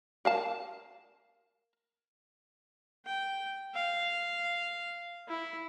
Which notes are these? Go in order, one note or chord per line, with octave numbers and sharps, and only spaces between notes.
A#4 F5 A5
G5
F5
E4